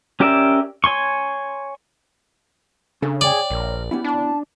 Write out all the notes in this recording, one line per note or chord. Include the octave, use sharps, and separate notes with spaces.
C#4 G4 A#4 D5 E5
C#5 G#5 C6 C#6
C#3 C#4 D4 A4
G#4 C#5 D5 G5
A#1 A#4
B3 C#4 E4 G4
D4 A5